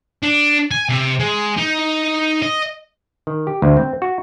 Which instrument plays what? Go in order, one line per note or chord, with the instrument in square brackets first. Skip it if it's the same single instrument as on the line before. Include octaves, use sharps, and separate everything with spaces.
[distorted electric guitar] D4
G#5
C3
G#3
D#4
D#5
[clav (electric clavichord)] D#3
G4
D2
C4
F#4